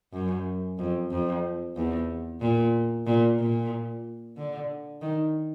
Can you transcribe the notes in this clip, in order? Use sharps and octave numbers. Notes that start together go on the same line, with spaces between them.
F#2
F2
F2
E2
A#2
A#2
A#2
D3
D#3